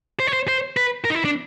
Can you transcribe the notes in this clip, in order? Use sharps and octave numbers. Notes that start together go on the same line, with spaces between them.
C5
C#5
C5
C5
B4
A#4
D#4
E4
D4